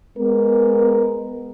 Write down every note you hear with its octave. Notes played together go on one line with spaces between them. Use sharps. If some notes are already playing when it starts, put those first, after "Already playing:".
G#3 B3 A#4